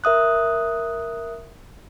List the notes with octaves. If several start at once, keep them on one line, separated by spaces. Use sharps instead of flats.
A#4 E5 D#6 F#6